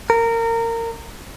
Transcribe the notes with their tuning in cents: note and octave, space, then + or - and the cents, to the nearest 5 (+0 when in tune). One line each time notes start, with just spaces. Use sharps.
A#4 -20